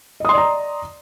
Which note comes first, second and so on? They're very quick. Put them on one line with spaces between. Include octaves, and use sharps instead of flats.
D#5 D#6 C6 D5 A#5